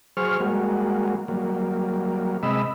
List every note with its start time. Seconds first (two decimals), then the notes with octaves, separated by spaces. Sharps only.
0.17 F#3 G#4 C5 C#6 F6
0.40 G3 G#3 A#3 F#4
1.28 F#3 G3 A#3
2.43 C3 G#3 D#5 B5 E6